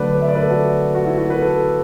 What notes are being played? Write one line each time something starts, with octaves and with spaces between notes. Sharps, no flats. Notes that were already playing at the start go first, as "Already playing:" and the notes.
Already playing: D3 F#3 A3 B4 D5
E5
D5
B4
A4
F#4
F#4
E4
F#4
B4
A4